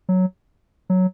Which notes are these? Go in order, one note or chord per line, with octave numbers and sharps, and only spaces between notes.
F#3
F#3